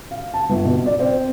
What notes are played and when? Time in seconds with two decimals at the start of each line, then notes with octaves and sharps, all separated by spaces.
0.11 F5
0.34 A5
0.49 G1
0.65 B2
0.86 D5
1.00 C4